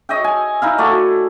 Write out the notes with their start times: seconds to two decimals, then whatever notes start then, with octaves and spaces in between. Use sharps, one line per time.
0.09 C#5 D#5 E5 G5
0.24 G#5
0.62 D#4 E4 F5
0.78 A3 F#4 D5